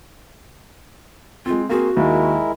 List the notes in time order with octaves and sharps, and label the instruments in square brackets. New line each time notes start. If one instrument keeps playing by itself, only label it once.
[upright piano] G#3 C4 [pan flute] F4
[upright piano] A#3 C4 G#4 [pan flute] F#4
[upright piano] D#2 [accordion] G#3 E4 A#4